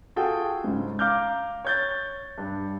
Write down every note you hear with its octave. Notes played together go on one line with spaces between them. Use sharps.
F4 F#4 G#4 A4 G5
G#2 C#3
F5 A#5 D6 F6 G6
C#5 G6 A6
G2